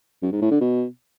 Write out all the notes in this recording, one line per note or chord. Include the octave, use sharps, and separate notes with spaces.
F#2
G#2
A2
D3
B2